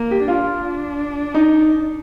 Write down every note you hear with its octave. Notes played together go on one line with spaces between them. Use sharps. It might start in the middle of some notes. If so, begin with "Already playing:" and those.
Already playing: A#3
G4
D4 F4
D#4